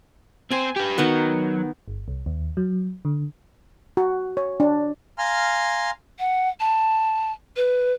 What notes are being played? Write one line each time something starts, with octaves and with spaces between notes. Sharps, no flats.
C4 C5 G#5
G4 B4
D#3 F#3 B3 F#5
G1
C2
D#2
F#3
D3
F#4
C#5
D4
F5 G#5 A#5 C6 F6
F#5
A5
B4